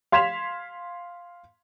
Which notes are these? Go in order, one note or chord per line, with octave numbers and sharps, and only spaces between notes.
F5 C6 G#6 B6 E7 F7